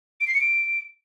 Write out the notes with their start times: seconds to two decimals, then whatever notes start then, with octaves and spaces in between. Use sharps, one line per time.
0.21 D7
0.27 C7
0.34 C#7
0.41 D7